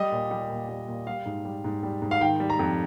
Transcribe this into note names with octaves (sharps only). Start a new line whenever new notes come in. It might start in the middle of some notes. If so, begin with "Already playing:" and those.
Already playing: G3 D#5
A#2
G3
A#2
G3
A#2
G3 F5
G#2
G3
G#2
G3
G#2
F5
D#3 G5
G3
A#5
F2